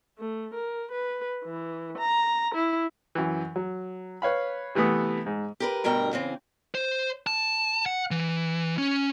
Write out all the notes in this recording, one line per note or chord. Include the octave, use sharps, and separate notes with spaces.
A3
A#4
B4
E3
A#5
E4
F#2 E3
F#3
B4 C#5 F5 B5
C3 E3 A3 B3 D#6
G#2
G4 A#4 B4
D2 G2 B2 A#4 G5
C#3 E3 C4
C5
A5
F#5
E3
C#4